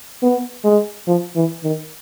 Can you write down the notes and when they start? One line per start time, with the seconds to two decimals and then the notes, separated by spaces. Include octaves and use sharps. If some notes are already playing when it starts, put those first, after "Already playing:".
0.23 B3
0.64 G#3
1.07 F3
1.35 E3
1.64 D#3